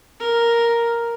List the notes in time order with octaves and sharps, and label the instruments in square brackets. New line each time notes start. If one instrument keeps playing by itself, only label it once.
[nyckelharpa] A#4